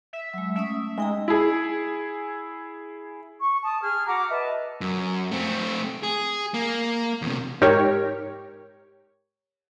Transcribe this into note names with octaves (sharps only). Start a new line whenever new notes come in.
E5
F#3 G#3
A3 C#4 E5 D#6
G#3 D#4 G5 A#5
E4 G#4
C#6
A5 D#6
G#4 F6
F#4 A#5 D6
B4 D#5 E5 A5
F#2
A3 C4
G#4
A#3
E2 C3
G#2 G4 A#4 C#5